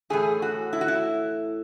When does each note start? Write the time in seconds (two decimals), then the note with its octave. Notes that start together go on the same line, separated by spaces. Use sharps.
0.10 A2 E3 A3 G#4
0.42 F#4
0.73 E4
0.81 F#4
0.88 E4